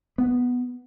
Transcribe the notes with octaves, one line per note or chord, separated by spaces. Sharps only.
B3